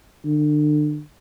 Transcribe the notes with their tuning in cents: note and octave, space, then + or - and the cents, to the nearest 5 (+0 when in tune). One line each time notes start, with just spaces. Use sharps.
D3 +35